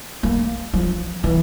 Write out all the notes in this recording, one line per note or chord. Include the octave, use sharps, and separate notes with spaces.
A#3
F3
E3